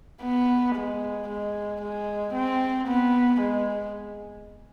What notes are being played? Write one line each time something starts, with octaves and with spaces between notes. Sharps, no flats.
B3
G#3
G#3
G#3
C4
B3
G#3